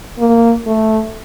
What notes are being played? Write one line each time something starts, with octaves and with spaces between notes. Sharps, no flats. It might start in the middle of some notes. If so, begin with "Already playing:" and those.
A#3
A3